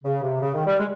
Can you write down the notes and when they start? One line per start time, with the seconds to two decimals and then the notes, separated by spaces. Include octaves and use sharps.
0.04 C#3
0.23 C3
0.41 C#3
0.54 D#3
0.66 G3
0.79 G#3